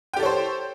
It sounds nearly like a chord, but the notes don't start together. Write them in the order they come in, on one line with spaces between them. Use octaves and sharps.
G5 G4 A4 C#5 C5